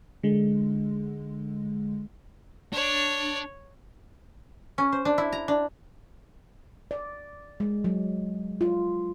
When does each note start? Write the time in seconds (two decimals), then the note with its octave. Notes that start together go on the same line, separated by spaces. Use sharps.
0.23 D3 G#3
2.73 D4 C#5
4.78 C#4
4.92 C5
5.05 D4
5.18 E4
5.32 A#5
5.48 D4
6.91 D5
7.60 G#3
7.84 F#3
8.61 F4